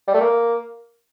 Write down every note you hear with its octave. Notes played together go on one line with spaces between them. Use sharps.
G3
A3
A#3